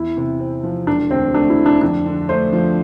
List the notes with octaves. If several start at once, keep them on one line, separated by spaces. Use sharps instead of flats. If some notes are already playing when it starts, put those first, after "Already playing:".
Already playing: E2 E4
C3
C4
F3
E1 D4
D2 C4
A3 D4
E4
D3
D4
F2 D4
D3
A3 C5
F3